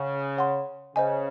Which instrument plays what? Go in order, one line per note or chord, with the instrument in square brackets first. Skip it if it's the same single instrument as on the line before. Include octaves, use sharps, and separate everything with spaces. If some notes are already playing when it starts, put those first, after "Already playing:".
Already playing: [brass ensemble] C#3 [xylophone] C#5 F#5
[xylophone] C#5 F#5 C6
[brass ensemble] C#3 [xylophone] C5 D#5 G#5